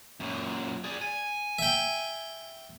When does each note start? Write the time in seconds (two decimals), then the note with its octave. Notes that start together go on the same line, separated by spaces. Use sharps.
0.20 F#2 A#2
0.84 G#4 D5
1.02 G#5
1.59 E5 G5